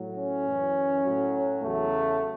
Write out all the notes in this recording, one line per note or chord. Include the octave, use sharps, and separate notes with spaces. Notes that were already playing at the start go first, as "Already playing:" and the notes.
Already playing: A2 F#3
C#4
F#2 E3
A2 F#3
E2 C#3 F#3 A3